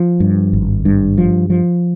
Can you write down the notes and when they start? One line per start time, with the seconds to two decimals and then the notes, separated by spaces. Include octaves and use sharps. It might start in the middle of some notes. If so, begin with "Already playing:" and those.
Already playing: F3
0.20 G2
0.53 G#1
0.85 G2
1.18 F3
1.50 F3